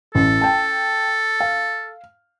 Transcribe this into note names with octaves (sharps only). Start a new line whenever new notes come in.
A1 A4
G5 A5
F5